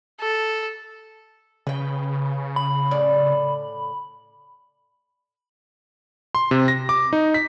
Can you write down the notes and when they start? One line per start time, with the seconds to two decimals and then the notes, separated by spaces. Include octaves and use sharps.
0.21 A4
1.67 C#3 B4 G5
2.56 B5
2.91 A2 D5
6.35 C6
6.51 C3
6.68 A#6
6.89 D6
7.13 D#4
7.34 B6